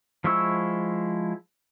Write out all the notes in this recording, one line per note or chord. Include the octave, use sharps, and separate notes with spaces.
F3 G#3 E4 C#6 E6